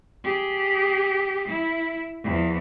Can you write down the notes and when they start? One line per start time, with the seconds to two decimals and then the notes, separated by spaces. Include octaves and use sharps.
0.24 G4 G#4
1.48 E4
2.23 E2 F3